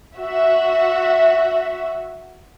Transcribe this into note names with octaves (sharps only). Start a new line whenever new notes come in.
F#4 E5